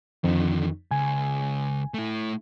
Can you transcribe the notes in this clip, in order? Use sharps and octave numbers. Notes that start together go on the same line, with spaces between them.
F2 D3 D#3
C#2 G#5
A3 E4